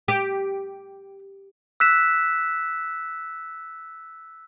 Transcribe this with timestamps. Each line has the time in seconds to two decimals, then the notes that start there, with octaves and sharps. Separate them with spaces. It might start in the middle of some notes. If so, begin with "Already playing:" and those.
0.08 G4
1.80 E6 F#6 B6 E7